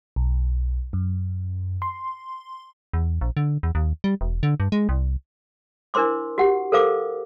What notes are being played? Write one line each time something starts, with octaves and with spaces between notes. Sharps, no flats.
B1
F#2
C6
E2
A#1
D3
E2
D#2
G3
E1
D3
G2
G#3
C2
D4 E4 A#4 C5 C6 D6
F#4 G4 F#5
A4 A#4 C5 F5 D6